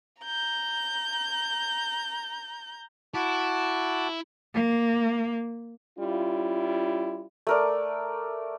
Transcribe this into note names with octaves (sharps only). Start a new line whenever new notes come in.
A#5 G6
E4 F#4 A5 D6
A#3
G3 C#4 E4 F4
A3 A#4 D5